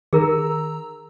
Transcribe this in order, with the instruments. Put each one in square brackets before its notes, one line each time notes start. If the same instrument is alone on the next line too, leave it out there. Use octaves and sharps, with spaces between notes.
[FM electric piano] D#3 A#5 E6 [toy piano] G#4 A#4